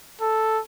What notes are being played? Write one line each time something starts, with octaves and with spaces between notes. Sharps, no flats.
A4